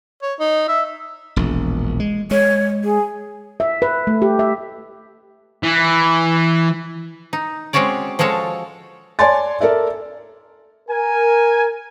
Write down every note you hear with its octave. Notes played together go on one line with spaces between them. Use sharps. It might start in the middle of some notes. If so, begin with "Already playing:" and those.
C#5
D#4
E5
E1 A#1
G#3
G#3 C#5
G#4
E5
B4
A3
G4
E5
E3
D#4
G#3 C4 C#4 F#4 C#5 D5
F3 G#3 F#4 A4 C#5
C#5 D5 G#5 A5 C6 A6
A4 A#4 D5 E5
A#4 G#5